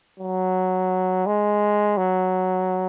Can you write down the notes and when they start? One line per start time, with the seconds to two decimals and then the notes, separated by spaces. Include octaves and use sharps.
0.20 F#3
1.27 G#3
1.97 F#3